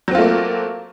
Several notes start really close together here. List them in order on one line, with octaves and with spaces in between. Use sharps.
F#3 C4 F4 A3 A#3